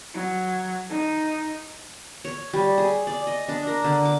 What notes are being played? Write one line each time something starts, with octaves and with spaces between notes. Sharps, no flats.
F#3
D#4
C#5
G3
G#4
D5
D#5
D4
A#4
D3
D6